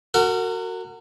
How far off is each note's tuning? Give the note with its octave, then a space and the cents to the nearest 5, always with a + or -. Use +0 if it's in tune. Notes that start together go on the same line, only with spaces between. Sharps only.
F#4 +0 A#4 -35